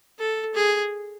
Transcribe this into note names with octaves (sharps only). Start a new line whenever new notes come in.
A4
G#4